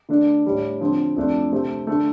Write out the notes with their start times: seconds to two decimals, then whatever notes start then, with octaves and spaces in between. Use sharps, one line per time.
0.09 D3 A3 D4
0.45 A2 G3 D4
0.81 D3 F3 C4
1.16 F2 F3 A3 D4
1.52 C3 A3 C4
1.87 D3 A3